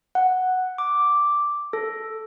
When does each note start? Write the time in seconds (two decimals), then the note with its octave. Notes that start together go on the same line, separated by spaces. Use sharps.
0.15 F#5
0.78 D6
1.73 A4